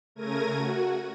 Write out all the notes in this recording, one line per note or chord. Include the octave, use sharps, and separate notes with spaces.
C#3 A3 A#4 G#6 A#6 D#7
F#4